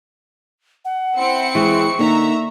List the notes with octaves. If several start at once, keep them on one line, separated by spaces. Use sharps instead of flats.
F#5
C4 E4 C#7
E2 E3 G#3 C#6
D3 A#3 D#4 E5 A#5